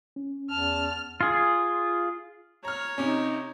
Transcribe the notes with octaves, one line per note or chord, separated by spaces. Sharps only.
C#4
E2 A5 F6
F4 G#4
C#5 A#5 F6
C3 C#4 D#4